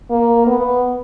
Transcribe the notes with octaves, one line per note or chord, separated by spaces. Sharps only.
A#3
B3